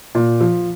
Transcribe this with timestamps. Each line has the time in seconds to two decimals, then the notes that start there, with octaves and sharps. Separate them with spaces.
0.15 A#2
0.41 F3